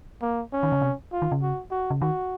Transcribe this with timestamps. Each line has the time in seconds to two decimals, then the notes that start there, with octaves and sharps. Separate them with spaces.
0.22 A#3
0.53 C#4
0.63 D#3
0.72 C#3
0.81 C3
1.12 F4
1.22 D#3
1.32 C#3
1.42 F#4
1.71 F#4
1.90 C#3
2.02 D#3 F#4